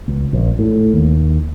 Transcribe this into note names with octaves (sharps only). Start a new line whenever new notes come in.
C#2
A#1
A2
D#2